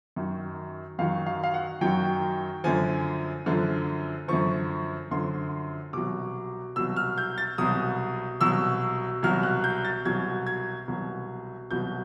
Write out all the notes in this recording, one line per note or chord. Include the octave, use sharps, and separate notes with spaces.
F#2 D#3 F#3
F#2 D#3 F#3 F5
F5
F5
F#5
F#2 D#3 F#3 G5
F#2 D3 F3 G#5
F#2 D3 F3
F#2 D3 F3 C#6
F#2 D3 F3 C6
C2 B2 F#3 D6
C2 B2 F#3 E6
F6
G6
A6
C2 B2 F#3 D#6
C2 B2 F#3 E6
C2 B2 F#3 F6
F#6
G6
A6
C2 B2 F#3 G#6
G#6
C2 B2 F#3
C2 B2 F#3 G6